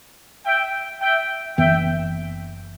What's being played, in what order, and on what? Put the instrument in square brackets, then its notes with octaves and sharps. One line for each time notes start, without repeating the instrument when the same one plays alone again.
[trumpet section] E5 G5
E5 G5
[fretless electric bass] F#1 F#2 E3 B3 [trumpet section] E5 G5